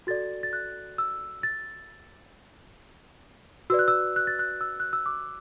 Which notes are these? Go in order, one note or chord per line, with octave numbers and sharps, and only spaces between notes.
F#4 A4 D5 A6
A6
F#6
E6
A6
F#4 B4 D5 E6
F#6
E6
F#6
A6
F#6
E6
F#6
E6
D6